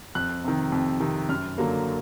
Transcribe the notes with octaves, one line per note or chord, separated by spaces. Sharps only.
F2 F#6
C3 D#3
F2
C3 D#3
F#2 F6
D3 F#3 A#3